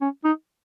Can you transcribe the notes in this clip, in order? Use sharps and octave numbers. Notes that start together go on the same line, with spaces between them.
C#4
D#4